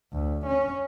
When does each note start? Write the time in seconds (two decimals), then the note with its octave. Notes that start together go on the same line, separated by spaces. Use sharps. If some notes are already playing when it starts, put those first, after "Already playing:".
0.13 D2
0.46 C#4